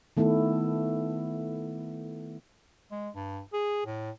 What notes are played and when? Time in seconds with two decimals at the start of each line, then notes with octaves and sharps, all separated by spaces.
0.17 D#3 A3 B3 E4 A4
2.91 G#3
3.15 G2
3.53 G#4
3.86 A2